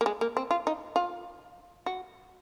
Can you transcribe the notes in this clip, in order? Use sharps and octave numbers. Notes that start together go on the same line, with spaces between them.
A#3
G#3
A#3
C4
F4
D#4
F4
F#4